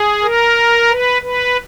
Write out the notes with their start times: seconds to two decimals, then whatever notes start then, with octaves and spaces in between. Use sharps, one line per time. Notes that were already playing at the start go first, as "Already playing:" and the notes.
Already playing: G#4
0.22 A#4
0.90 B4
1.22 B4